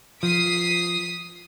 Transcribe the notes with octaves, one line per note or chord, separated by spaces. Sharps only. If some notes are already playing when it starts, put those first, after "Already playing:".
F3 D#6 B6 C7